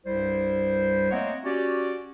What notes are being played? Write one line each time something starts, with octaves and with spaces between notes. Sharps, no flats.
C2 G2 G3 E4 C5
A3 A#3 C4 C#5 D#5 F#5
C#4 F#4 G4 D5